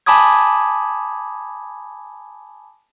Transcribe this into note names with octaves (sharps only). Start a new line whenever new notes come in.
G#5 A5 B5 D6 D#6 G#6